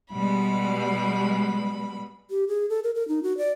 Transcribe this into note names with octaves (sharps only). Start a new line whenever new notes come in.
B2 G3 G#3 B5
G4
G#4
A4
A#4
A#4
D#4
F#4
D5